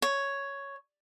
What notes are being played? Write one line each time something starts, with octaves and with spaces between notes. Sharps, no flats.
C#5